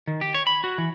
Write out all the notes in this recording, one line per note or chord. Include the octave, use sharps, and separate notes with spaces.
D#3
G4
C#5
B5
F#4
E3